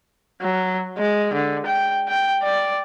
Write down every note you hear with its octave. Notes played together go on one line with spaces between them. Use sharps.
F#3
G#3
D3
G5
G5
D5